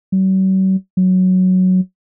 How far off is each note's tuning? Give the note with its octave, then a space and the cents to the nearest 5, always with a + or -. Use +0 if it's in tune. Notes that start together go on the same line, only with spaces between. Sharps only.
F#3 +45
F#3 +0